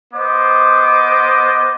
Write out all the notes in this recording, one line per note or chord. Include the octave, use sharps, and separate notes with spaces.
B3 C5 D#5 D6